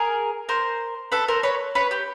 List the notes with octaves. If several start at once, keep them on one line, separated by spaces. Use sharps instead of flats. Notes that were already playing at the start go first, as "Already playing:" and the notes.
Already playing: G#4 A#4
A#4 C5
A4 B4
A#4 C5
B4 C#5
B4 C#5
G4